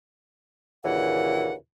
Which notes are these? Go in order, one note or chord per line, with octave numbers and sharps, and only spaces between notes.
D#2 A#2 C#3 E3 F#5